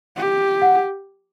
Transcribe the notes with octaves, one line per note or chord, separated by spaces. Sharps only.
G4
F#5